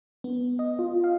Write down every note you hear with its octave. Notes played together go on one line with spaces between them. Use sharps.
B3
D#5
F4
F5